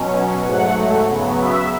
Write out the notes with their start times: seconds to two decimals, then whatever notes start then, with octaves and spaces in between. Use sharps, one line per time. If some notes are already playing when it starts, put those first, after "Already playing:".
Already playing: B2 F#3 C#4
0.42 G#2 F#3 A3 F#5
1.05 C#3 F#3 B3
1.37 E5